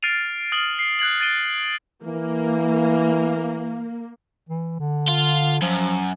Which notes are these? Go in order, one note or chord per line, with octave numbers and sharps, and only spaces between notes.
F6 A6 C7 D7 D#7 F7
D#6 F6 A6 F#7
C7
F#6 G#6 C7 F#7
A6 D7 D#7 G7
E3 A#3
E3
D3
F4
F#2 F3